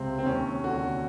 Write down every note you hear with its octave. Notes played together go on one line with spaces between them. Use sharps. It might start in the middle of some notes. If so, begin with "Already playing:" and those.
Already playing: C#2 C3 C4
C4
D#2 C#4
D3 F#4